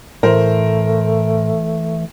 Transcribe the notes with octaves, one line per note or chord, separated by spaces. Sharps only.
A2 E3 A3 A#4 C5